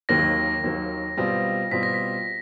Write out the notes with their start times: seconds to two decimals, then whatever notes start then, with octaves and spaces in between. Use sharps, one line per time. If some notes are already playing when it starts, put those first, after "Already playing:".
0.09 D#2 D#3 F#3 A#3 A#6
0.64 D#2 D#3 F#3 A#3
1.17 B2 G3 C4 F4
1.71 B2 G3 C4 F4 B6
1.83 A#6
1.94 B6